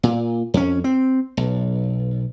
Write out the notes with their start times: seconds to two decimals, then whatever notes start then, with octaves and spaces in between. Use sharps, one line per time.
0.03 A#2
0.54 F2 C#4
0.84 C4
1.37 B1